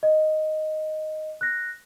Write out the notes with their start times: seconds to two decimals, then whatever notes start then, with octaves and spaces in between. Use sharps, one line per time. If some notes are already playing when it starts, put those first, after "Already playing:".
0.03 D#5
1.41 F#6 A#6